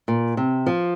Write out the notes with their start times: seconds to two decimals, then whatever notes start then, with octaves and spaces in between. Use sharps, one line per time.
0.08 A#2
0.37 C3
0.66 F3